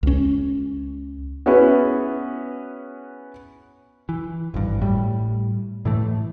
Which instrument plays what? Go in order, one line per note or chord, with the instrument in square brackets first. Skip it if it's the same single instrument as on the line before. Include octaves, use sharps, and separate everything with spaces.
[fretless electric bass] C#2 C#4
[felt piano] B3 C#4 E4 F#4 G#4 B4
[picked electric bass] E3
G#1 G2
A2 G3
A2 E3 A3